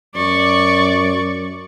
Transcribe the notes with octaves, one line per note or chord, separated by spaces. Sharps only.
F#2 D5 C#6